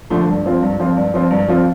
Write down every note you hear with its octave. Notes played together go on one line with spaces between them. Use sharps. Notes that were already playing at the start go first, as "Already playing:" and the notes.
D3 F3 A3 D4
G2
F3 C4 F4
G2
F3 C4 F4
G2
F3 C4 F4
G2
F3 C4 F4